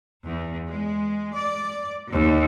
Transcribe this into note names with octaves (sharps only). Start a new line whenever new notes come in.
E2
G#3
D5
D#2